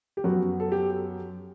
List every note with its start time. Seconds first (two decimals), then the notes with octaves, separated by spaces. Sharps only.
0.17 G4
0.24 F#2 F#3 B3 F#4
0.60 A4
0.72 G4